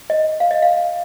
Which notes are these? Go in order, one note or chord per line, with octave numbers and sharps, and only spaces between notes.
D#5
F5
D#5
F5